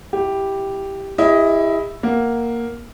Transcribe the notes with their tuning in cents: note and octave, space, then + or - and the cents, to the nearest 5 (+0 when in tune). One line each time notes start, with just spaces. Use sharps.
E4 +0 G4 +0
E4 +0 G4 +45 D#5 +20
A#3 +0 F#5 +0